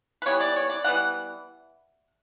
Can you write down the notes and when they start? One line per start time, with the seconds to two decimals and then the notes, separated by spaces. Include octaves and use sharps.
0.22 B4
0.26 E3 G3 B3 C#5
0.40 D5
0.56 C#5
0.70 D5
0.84 E3 G3 B3 F#5